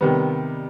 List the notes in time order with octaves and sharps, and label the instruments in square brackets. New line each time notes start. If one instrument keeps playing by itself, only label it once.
[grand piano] C3 D#3 G3 B3